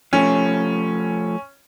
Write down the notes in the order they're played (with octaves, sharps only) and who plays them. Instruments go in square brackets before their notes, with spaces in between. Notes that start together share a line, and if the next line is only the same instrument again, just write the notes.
[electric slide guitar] F3 A3 [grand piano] C#4